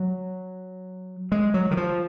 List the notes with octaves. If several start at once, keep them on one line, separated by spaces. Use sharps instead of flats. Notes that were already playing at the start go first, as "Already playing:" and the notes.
Already playing: F#3
G#3
F#3
D#3
F3